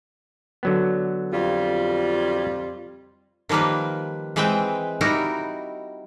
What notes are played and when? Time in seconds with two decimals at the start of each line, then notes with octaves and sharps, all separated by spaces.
0.63 D3 F#3 B3
1.33 F2 G3 F4
3.49 D#3 F3 G3 A#3 B4
4.36 E3 G#3 C4 B4 E5 G5
5.01 G3 D#4 E4 F#4 A#4